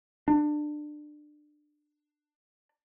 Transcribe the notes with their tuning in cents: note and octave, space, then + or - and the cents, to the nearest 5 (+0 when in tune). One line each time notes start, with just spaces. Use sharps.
D4 +25